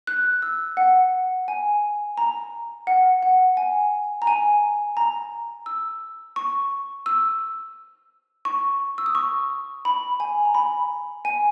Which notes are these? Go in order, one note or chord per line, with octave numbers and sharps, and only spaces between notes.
F#6
E6
F#5
G#5
A#5
F#5
F#5
G#5
A#5
G#5
A#5
E6
C#6
E6
C#6
E6
D#6
C#6
B5
G#5
A#5
B5
G#5